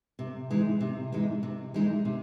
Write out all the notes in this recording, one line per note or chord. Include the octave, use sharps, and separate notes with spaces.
C3
E3 G#3 D#4
C3
E3 G#3 D#4
C3
E3 G#3 D#4
C3